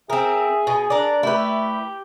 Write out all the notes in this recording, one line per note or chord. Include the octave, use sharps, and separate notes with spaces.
C4 G#4 A#4 E5
B2 G#5
D4 A#4 D5
A3 E4 G4 B4